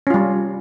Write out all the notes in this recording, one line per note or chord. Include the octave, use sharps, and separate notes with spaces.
G3 C#4 F4